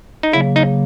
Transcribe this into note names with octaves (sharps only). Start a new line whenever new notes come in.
D#4
C#3 F#3 A#3 E4
D#4